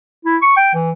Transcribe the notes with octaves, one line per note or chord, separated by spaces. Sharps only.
E4
C#6
G5
E3